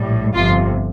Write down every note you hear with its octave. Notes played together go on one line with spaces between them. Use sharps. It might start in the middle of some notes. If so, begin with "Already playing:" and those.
Already playing: A#1 A2 G3
G1 F2 C3 F4